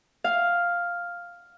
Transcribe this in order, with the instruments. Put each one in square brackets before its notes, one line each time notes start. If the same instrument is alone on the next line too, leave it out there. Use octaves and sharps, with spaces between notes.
[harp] F5